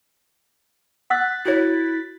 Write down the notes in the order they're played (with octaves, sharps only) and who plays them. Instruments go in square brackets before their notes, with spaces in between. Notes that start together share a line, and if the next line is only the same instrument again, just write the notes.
[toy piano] F#5 E6 [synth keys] F#6 A6 B6
[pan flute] E4 [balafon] F#4 A#4 C#5